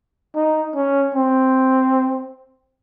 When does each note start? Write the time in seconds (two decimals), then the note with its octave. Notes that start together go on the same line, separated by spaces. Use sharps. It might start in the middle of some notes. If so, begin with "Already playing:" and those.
0.35 D#4
0.75 C#4
1.15 C4